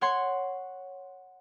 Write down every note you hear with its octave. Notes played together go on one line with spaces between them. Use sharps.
C#5 F#5 C6 G#6